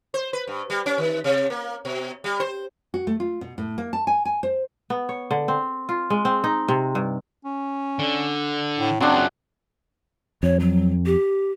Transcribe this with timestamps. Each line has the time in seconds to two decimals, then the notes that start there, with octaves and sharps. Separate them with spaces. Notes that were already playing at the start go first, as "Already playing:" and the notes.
0.14 C5
0.33 B4
0.47 G2
0.70 G3
0.86 C#4
0.98 D#3
1.24 C3
1.50 A#3
1.85 B2
2.24 G3
2.40 C5
2.94 F#4
3.07 A3
3.20 F4
3.41 B2
3.58 A2
3.78 A#3
3.93 A5
4.07 G#5
4.25 G#5
4.43 C5
4.90 B3
5.09 C#5
5.31 D3
5.48 C4
5.89 F4
6.10 G#3
6.25 C4
6.44 D#4
6.68 C3
6.95 G2
7.45 C#4
7.99 D3
8.78 A2
9.00 F#2 F#3 C4 D4 G#4
10.43 F2 C#5
10.60 F#3
11.06 G4